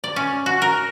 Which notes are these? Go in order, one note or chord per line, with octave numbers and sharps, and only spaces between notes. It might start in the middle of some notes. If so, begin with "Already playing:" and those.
D5
C#4
F#4
A#4